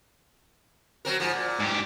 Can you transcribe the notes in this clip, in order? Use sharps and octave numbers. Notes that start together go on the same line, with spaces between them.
F#3 C4 A#4
G#2 F3
A#2
G#2 G4